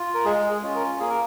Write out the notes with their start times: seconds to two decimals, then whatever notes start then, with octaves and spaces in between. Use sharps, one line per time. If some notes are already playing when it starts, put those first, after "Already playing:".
Already playing: F4
0.15 A#4
0.25 G#3 G#4
0.51 G#4
0.63 C#4 F4
0.75 A#4
1.00 A#3 G#4
1.10 A#4